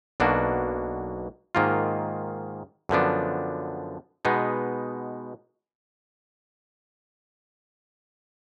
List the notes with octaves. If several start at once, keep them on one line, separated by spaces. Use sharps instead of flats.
B1 B2 A#3 D4 F#4
G#2 D#3 A#3 F4
F#2 D3 F3 B3 D4
B2 G#3 B3 D#4